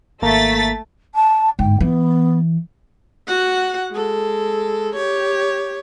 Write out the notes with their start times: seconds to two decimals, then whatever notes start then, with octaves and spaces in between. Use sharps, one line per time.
0.22 G#1 A3 A#3 A#5 A6 B6
1.14 A5
1.59 G1 G#2 G5
1.81 E3 B3
3.28 F#4 F#5
3.92 G#3 A4
4.95 G4 C#5